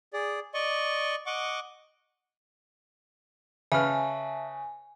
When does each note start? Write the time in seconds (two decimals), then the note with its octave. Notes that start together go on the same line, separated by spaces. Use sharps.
0.13 G#4 D5
0.54 D5 D#5 C#6
1.26 D#5 F#5 C#6 D6
3.72 C#3 B4 E5 G#5 A5 F6